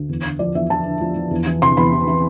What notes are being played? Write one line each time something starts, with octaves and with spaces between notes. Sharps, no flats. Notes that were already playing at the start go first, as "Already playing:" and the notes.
Already playing: D2
E2
D3
F3 D5
E2 E5
F3 A5
D3
F3
F3
E2
E3
C3 C6
E2 B5
E3
E3